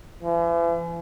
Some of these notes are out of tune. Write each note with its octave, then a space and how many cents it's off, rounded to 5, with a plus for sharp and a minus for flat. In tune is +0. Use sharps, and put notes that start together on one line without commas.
E3 +40